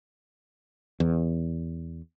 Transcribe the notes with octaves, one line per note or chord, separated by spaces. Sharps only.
E2